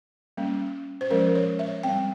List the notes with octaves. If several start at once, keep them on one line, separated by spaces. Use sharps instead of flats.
G3 A#3 C#4
C5
F3 G#3 C#4 A#4
C#5
E5
G3 C4 G5